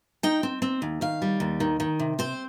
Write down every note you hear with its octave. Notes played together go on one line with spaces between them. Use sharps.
D#4 G5
C4
C4
D#2
D#3 F5
G3
D#2
D#3
D#3
C3
C4 C5